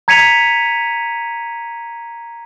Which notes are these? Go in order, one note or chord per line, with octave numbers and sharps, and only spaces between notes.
A#5 G#6 B6 C#7 D#7 F7